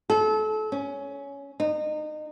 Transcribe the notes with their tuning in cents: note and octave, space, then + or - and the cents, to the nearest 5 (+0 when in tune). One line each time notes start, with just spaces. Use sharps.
A4 -30
C#4 +15
D#4 -30